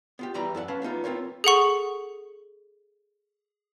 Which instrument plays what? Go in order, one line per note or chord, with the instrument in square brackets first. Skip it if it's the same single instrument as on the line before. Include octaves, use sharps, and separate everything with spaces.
[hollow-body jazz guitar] B3 F4 G4
E2 E3 G3 D5 A#5 B5
F#2 A4 A#4 F#5
C#4 B4 F5 A5
A3 B3 D#4 F4
B3 C4 F4 A#4 C#5
[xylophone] G#4 A4 F#5 C#6